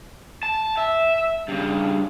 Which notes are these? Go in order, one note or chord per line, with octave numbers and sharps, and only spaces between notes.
A5
E5
G2 C#3